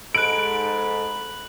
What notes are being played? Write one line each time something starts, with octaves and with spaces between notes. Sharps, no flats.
G#2 A4 B5 F#6 D7 F#7